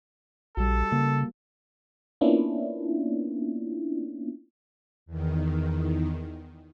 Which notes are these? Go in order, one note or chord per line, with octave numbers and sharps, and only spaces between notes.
A#1 G3 F#4 A4
C#3 A#3
A#3 B3 C#4 D4 E4 F4
E2 D#3